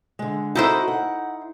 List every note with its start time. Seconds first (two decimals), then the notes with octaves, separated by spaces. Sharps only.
0.19 D3 G#3
0.55 D#4 E4 F#4 A4 C5
0.88 F#5